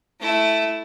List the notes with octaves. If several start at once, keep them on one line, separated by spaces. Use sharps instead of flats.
A3 E4